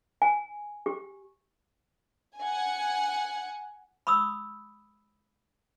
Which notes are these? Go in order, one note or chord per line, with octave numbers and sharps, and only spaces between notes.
G#5
G4
F#5 G#5
B5 C#6 D#6 E6